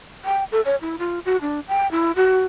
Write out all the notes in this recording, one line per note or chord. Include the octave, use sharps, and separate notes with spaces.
G5
A4
C#5
E4
F4
F#4
D4
G5
E4
F#4